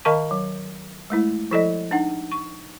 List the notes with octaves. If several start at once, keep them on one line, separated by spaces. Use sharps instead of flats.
D#3 A#4 D#5 F5 A5 C#6
F#3
G#3 A3 E4
F3 E4 A4 D5 D#5
D4 D#4 F#5
C#6